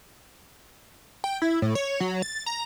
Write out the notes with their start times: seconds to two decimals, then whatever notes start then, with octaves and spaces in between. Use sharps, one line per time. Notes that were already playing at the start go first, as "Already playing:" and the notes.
1.24 G5
1.42 E4
1.62 A2
1.75 C#5
2.00 F#3
2.22 A6
2.46 A#5